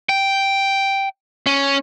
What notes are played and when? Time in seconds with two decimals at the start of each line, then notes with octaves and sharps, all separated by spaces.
0.09 G5
1.46 C#4